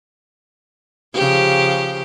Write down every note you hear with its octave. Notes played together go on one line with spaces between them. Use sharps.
C#3 F3 G4